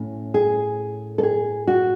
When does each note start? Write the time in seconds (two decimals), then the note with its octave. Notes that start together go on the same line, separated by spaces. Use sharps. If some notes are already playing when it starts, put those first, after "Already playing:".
Already playing: A2 C#4
0.34 G#4
1.18 A4
1.23 G#4
1.67 F#4